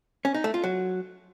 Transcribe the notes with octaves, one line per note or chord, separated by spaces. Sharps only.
C#4
D#4
A3
F4
F#3